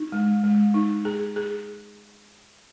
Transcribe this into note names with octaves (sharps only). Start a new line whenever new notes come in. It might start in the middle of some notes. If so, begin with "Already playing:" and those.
Already playing: D#4
G#3
G#3
D#4
G#4
G#4